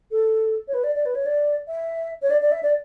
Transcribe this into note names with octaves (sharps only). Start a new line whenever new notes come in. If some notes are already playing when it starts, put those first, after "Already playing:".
A4
C#5
B4
D5
D5
B4
C#5
D5
E5
C#5
D5
D5
E5
D5